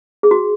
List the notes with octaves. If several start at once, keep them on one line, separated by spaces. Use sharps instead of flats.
G#4
F#4